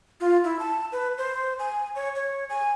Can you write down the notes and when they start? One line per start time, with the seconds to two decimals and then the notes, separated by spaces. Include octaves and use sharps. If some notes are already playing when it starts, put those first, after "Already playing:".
0.20 F4
0.44 E4
0.59 A5
0.92 B4
1.18 C5
1.59 G#5
1.95 C#5
2.15 C#5
2.50 G#5